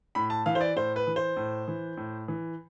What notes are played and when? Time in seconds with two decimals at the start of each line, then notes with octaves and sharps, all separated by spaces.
0.15 A2 B5
0.30 A5
0.46 E3 F5
0.55 C5
0.61 D5
0.76 A2 C5
0.96 B4
1.07 E3
1.16 C5
1.37 A2
1.68 E3
1.97 A2
2.28 E3